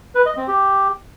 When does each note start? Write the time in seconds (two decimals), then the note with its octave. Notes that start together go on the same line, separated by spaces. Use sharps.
0.15 B4
0.26 D#5
0.37 C4
0.48 G4